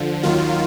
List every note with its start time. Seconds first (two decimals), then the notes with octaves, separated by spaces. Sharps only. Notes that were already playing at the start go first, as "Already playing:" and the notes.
Already playing: D3 F3
0.23 D#2 D#3 F#3 F4